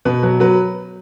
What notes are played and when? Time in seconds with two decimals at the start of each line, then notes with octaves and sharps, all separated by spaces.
0.05 B2 B4
0.23 F#3 B4
0.40 F#3 B4